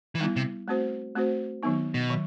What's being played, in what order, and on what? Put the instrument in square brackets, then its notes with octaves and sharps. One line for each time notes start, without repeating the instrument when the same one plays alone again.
[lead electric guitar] E3
[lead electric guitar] D#3 [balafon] G3 B3 E4
[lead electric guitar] C3
[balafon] A3 C4 F#4 C5
A3 C4 F#4 C5
D#3 F#3 B3 D#4
[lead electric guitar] B2
[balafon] D#3 F#3